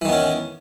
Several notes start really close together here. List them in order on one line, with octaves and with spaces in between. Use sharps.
E3 D#3 B3 C#4